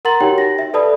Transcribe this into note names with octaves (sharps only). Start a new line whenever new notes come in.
A#4 F#5 A#5 C6 A6 F#7
D#4 F#4 G4 C#5 G5
A#6
E5
A4 B4 D5 A5 B5 D#6